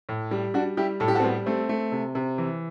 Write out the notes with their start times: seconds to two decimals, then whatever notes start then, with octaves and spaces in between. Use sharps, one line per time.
0.09 A2
0.31 G3
0.54 G3 D4 F#4
0.77 G3 E4 G4
1.00 A2 A4
1.08 G4
1.15 F#4 A4
1.20 C4
1.24 G3 B3
1.46 A3 C4
1.69 A3
1.92 C3
2.15 C3
2.38 E3